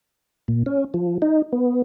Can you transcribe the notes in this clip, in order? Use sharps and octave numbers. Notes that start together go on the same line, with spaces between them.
A#2
C#4
F3
D#4
B3